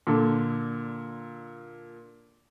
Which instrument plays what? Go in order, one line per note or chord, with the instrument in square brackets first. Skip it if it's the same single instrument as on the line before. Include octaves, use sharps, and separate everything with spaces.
[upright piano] A#2 D3 A4